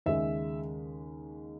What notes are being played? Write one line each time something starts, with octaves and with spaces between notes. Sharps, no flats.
D#2 C#3 G#3 E5